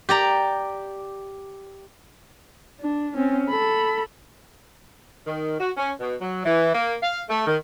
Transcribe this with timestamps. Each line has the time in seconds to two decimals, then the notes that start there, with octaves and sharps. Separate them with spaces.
0.09 G4 D5 A#5
2.80 D4
3.16 C4 C#4
3.49 A4 B5
5.27 D#3
5.60 F#4
5.76 C#4
6.00 B2
6.21 F#3
6.45 E3
6.75 A#3
7.03 F5
7.29 A3
7.47 D#3